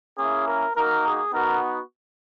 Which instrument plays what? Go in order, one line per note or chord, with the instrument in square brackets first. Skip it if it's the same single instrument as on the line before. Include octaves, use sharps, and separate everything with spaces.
[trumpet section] A#3 C#4 E4 G#4
A#4
A#3 D#4 F#4 A#4
G#4
B3 D#4 F#4 A#4